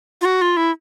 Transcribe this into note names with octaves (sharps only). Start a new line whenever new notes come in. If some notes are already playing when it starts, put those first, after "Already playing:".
F4
F#4
F4
E4